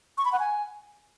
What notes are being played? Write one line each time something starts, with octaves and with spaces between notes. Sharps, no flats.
C#6
B5
F#5
G#5